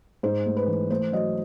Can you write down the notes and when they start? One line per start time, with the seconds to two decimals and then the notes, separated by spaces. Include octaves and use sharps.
0.23 G#2 C5
0.46 A3
0.57 B4
0.68 E3
0.90 A3 C5
1.12 F#3 D#5